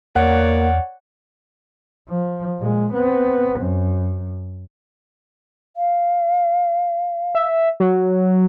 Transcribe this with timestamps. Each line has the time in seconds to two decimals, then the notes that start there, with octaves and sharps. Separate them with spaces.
0.16 E2 A#3 C#5 D5 F#5
2.09 F3
2.59 A#2 G#3
2.93 B3 C4
3.60 F#2
5.77 F5
7.35 E5
7.80 F#3